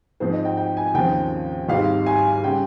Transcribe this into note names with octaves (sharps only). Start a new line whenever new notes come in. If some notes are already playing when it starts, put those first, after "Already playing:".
G#2 F3 C4 C5
D#5
G5
G5
G#5
D#2 C#3 F3 C4 G5
G#1 G#2 G3 F5
G#5
C#3 G3 G5